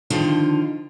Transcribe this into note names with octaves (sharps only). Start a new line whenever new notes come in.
D3 D#3 F3 F4